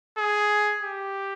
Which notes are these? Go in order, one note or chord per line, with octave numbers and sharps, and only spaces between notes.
G#4
G4